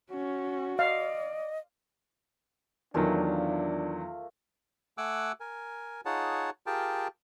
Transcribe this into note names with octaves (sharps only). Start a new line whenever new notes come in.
C#4 F#4
D5 D#5 F5
E2 D#3 F#3 A3 A#3 D4 F4
A3 F#5 G#5 D6 E6 F#6
A#4 G#5
D#4 F4 G#4 C#5 F#5 A5
F4 G4 G#4 A#4 G5 A5